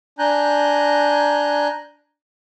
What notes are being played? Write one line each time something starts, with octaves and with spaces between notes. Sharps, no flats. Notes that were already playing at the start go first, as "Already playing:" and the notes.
D4 G#5 A#5 F#6 G6